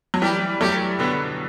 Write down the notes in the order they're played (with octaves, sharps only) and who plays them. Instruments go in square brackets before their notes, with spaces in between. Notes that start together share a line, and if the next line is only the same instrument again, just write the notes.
[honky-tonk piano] F#3
[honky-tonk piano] E3 G3 [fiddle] G4
[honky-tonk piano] F#3 A3 [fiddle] G4
[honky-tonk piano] B2 D3 [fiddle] B3